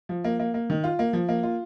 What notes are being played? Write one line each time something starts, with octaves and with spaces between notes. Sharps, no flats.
F3
A#3
A#3
A#3
D#3
F4
A#3
F3
A#3
F4